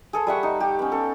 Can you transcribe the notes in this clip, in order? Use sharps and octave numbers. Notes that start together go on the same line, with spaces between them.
G#4 A4 C5
G3 E5 F#5 C#6
D#4
G4
B3 C#4
A4